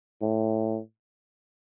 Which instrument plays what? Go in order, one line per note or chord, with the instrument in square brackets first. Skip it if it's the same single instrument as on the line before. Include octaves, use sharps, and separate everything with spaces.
[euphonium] A2